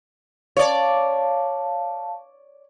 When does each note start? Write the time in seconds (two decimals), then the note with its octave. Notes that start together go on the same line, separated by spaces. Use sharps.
0.57 C#5 D5 F5 A5